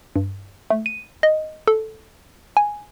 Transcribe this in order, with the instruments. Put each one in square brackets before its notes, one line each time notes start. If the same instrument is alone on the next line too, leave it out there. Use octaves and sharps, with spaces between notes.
[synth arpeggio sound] G2
A3
D#7
D#5
A4
G#5